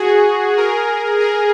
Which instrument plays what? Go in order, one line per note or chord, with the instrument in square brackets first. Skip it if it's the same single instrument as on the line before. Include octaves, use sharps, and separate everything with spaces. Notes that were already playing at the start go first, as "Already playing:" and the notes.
Already playing: [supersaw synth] F#4 G#4
G#4 A#4
G#4 A#4